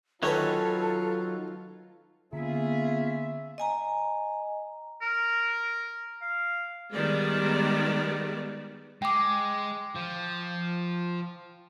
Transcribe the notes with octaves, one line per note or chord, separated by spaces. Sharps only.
D#3 F#3 C#4 D#4 F4 A4 B4 C#5
D3 A#3 B3 C#4 F4 G#4 E5
D#5 G#5 A#5
A#4
F5
D#3 G3 G#3 B3 D5
G#3 G5 D6
F3